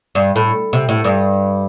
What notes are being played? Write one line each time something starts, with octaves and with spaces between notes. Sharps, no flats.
G2
A2
C3
A2
G2